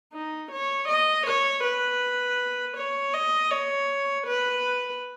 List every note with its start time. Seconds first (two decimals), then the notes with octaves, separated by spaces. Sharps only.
0.13 D#4
0.52 C#5
0.88 D#5
1.26 C#5
1.64 B4
2.77 C#5
3.14 D#5
3.51 C#5
4.26 B4